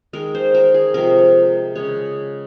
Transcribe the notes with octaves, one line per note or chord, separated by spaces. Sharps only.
D#3 G#3 A#4
C5
A#4
G#4
C3 F3 G#3 A#4
C#3 G#3 C#5